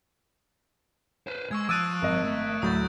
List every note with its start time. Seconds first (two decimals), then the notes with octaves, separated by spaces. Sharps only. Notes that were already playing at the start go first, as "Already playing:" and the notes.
1.27 B4 C5
1.51 G#3 C#6 E6 G#6
1.69 F3 D#6 E6 F#6 A6 D7 D#7
2.02 G#1 D#5
2.24 A3
2.62 D2 A2 F#3 D#6 G6 A6